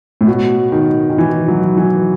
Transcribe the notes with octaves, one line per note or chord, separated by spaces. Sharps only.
A2
B2
D#3
D#3
E3
F#3
E3